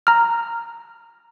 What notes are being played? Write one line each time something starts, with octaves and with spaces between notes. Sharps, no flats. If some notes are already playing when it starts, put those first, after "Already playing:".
A#5 F6